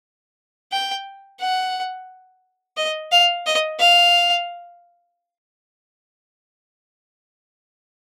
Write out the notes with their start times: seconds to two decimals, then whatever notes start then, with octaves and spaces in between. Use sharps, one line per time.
0.72 G5
1.40 F#5
2.77 D#5
3.11 F5
3.46 D#5
3.80 F5